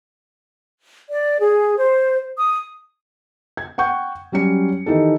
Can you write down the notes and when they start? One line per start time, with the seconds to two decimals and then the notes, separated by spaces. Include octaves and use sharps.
1.10 D5
1.39 G#4
1.77 C5
2.38 D#6
3.57 G#6
3.78 F#5 G5 C#6 G6
4.32 F#3 G3 C#4 C#7
4.86 D#3 E3 D#4 G4 A4